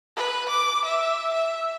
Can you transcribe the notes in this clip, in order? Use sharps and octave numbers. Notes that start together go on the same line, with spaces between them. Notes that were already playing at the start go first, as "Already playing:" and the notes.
B4
D6
E5
E5